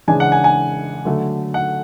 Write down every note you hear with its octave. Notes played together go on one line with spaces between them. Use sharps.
C#3 E3 G#3 D4 G#5
F#5
G#5
G#5
D3 F#3 A3
F#5